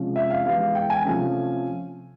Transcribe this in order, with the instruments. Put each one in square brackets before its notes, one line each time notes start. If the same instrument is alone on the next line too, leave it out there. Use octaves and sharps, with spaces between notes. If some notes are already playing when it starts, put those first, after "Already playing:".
Already playing: [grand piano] C3 F3 G#3 C#4
E5
F5
E3 G#3 B3 F5
G5
G#5
C3 F3 A3 C#4